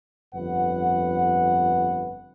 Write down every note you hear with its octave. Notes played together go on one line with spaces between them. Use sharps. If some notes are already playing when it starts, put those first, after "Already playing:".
G1 F2 B4 F#5